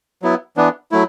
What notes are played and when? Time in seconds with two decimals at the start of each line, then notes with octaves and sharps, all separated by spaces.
0.22 F#3 B3 E4
0.57 E3 B3 D4
0.92 F#3 A3 E4